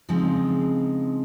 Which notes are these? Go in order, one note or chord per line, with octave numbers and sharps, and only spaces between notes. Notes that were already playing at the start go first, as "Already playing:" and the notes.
C#3 F3 G#3 C4 D#4